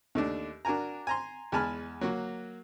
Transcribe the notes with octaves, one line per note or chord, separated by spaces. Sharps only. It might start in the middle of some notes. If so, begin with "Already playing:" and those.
D#2 A3 D4
D4 F#4 A#4 G#5 A#5
G#5 A#5 C6
E2 G#3 G#5 A5 B5 F6
F#3 A#3 F#4